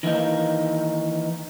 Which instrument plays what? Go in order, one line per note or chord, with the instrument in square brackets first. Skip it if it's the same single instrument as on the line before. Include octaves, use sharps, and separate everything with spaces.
[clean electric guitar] D#3 E3 A#3 D#4